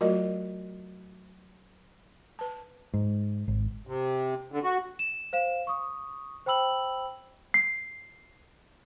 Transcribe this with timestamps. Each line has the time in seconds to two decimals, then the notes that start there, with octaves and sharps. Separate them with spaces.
0.01 F#3 A3 F4 F#4 A#4 D#5
2.39 B4 A5
2.94 G#2
3.48 G#1
3.87 C3
4.52 D3
4.64 F#4
4.99 E7
5.33 C5 F5 E7
5.67 C#6 D#6
6.46 C5 G5 B5 E6 F#7
7.54 C7